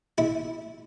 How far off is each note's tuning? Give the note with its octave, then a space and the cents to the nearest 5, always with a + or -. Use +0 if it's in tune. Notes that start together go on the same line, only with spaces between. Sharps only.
E4 -15